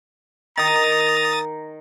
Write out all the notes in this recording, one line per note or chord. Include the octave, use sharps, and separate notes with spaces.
D#3 A#5 D#6 A6